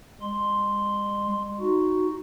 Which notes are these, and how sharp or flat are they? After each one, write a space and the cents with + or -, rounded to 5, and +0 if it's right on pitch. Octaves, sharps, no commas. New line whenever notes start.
G#3 -40 C6 +0
D#4 +0 F#4 +0